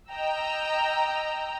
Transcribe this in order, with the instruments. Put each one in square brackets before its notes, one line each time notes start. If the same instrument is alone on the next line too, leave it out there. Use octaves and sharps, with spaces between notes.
[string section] D#5 G5 A#5 E6